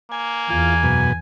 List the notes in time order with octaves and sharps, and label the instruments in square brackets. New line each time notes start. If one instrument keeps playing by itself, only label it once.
[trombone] A#3 [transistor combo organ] G#5
[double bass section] E2 [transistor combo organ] F4 [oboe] G#5
[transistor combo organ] F#2 B2